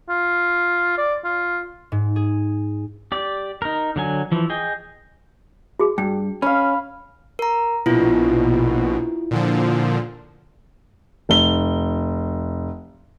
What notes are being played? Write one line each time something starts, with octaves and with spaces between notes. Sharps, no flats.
F4
D5
F4
G#2
G#4
G4 D5
D#4 A#4
D3 F#3 G#5
E3 F3
G#4 D#5 G5
F#4 G#4
G2 G5
C#4 F5 B5
A#4 A#5
A#1 B2 E4 F4
A#2 D3 F3
F1 G7